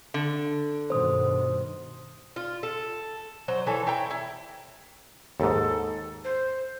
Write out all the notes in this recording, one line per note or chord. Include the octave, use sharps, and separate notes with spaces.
D3
G2 B2 D#3 C5 D#6
F4
A4
F#3 C5
E3 A4 C#5
E4 G5 A#5
E4
D#2 G#2 A4
C5